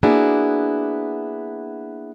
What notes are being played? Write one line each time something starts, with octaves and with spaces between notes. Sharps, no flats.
A#3 B3 D4 E4 F#4 G#4